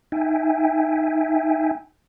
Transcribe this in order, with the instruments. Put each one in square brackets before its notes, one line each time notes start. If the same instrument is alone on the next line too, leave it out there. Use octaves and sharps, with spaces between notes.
[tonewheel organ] D#4 E5 G5 G#5